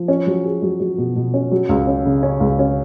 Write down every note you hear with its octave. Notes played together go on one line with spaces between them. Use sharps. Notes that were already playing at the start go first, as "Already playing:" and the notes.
Already playing: F3
C#4
F#3
G#4
F#3
F#3
B2
B2
C#4
F#3
C#2
C#4
C#3
C#4
C#2
C#4